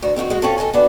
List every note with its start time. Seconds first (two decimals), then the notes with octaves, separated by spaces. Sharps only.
0.02 D2 F#4
0.16 C4 D#4 F4 F#4
0.30 G#3 F#4
0.42 C4 C#4 F4 A4
0.58 A4 A#4 D#5 G#5
0.73 B3 D4 F#4